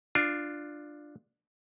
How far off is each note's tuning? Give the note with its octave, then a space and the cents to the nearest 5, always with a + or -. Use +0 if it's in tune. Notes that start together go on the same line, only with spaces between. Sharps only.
D4 +10 F4 +0